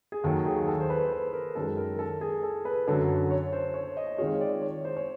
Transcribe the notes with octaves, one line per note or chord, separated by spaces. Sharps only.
G#4
D#2 D#3 F#3 A4
G#4
A4
C5
B4
C5
B4
A#4
F#2 D#3 G#3 A4
A#4
A4
G#4
A4
B4
F#2 D3 F#3 A4
A4
C#5
C5
C#5
D#5
D#3 G#3 C4 F4 G#4 C#5
D5
C#5
C5
C#5